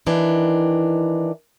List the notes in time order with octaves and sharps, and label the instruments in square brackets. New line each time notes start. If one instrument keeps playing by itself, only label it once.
[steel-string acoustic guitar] D#3 E3 D4